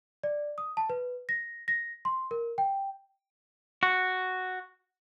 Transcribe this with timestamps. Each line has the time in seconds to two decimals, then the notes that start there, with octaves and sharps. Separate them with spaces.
0.23 D5
0.58 D#6
0.77 A5
0.90 B4
1.29 A#6
1.68 A#6
2.05 C6
2.31 A#4
2.58 G5
3.83 F#4